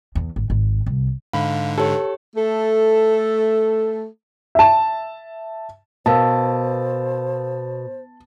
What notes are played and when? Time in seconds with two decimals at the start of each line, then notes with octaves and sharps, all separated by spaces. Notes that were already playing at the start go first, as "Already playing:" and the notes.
0.15 E2
0.36 G#1
0.50 G#1
0.86 C2
1.33 G#2 D3 F5 B5
1.78 G4 A4 C#5
2.36 A3 A4
4.55 E5 A5
6.06 B2 A#4 C5 F5 A5 E6